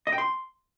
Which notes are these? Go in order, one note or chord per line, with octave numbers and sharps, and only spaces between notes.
D#5
G5
C6